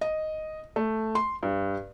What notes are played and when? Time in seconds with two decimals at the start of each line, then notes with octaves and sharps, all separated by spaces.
0.01 D#5
0.76 A3
1.15 C6
1.43 G2